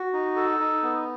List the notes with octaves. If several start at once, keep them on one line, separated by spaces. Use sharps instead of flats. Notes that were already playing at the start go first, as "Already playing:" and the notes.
Already playing: F#4
D#4
A4
D#4
B3